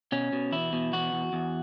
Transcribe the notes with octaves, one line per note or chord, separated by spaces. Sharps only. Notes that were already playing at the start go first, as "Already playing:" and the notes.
B2 C#4
B2
E2 E4
B2
E2 F#4
E2
E2